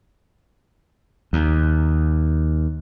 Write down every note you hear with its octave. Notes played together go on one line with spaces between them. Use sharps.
D#2